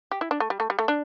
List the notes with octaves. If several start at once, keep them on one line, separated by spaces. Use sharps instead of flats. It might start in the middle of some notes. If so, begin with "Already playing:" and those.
G4
E4
D4
A3
G3
A3
G3
A3
D4